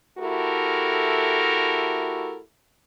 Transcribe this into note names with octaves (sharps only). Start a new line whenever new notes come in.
A3 E4 F#4 G4 A4 A#4